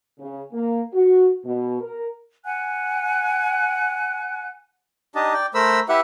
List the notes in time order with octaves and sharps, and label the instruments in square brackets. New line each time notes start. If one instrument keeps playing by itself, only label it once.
[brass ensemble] C#3
A#3
F#4
B2
A#4
[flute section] F#5 G#5 F#6
[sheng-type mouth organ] D4 D#4 G4 D#5 A5
D5 G5
A3 A#4 C5 B5 E6
E4 G4 B4 E5 F#5